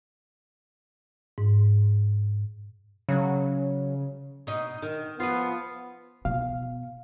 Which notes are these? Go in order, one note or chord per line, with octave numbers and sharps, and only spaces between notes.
G#2
C#3 F#3
B2 D#4
D#3 D#4
F3 B3 F4 B4
B2 F5